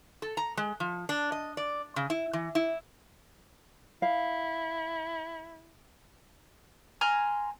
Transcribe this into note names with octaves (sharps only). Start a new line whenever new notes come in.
A4
A#5
G#3
F3
D4
D#5
D5
C#3
E4
E3
E4
E4 F5
G#5 A#5 C6 F6